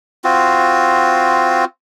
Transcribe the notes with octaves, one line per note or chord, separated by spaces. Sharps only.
C4 F4 F#4